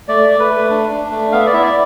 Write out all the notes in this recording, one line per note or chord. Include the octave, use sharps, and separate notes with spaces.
A3 D5
A3
B4
A3
D4
D4
A3
B3 F5
E5
D5
E4 E5
D5